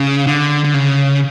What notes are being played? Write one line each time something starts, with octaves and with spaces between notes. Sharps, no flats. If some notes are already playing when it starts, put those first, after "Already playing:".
Already playing: C#3
D3
D3
C#3